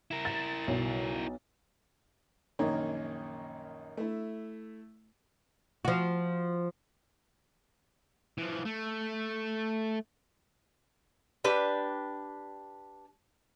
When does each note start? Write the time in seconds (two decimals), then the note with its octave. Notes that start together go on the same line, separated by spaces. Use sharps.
0.11 E4 A#4
0.25 A6
0.67 B1
2.59 A#1 F#2 D#3 A#3 D#4 C#5
3.97 A3 E4
5.85 F3 F#4
8.38 E3 F3
8.65 A3
11.44 D4 G4 B4